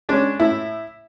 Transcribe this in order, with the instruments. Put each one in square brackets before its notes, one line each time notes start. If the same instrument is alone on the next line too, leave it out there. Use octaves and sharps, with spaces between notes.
[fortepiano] G#3 C#4 D4
A2 E4